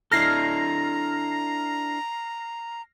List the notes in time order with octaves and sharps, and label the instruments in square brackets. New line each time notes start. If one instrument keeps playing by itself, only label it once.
[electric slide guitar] D4 E4 A4 [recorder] A#5 [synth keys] F6 A#6 C7